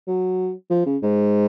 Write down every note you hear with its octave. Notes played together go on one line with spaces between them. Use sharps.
F#3
F3
C#3
G#2